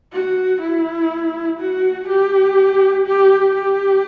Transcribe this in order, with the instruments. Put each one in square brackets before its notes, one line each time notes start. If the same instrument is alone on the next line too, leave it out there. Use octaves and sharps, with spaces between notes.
[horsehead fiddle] F#4
E4
F#4
G4
G4
G4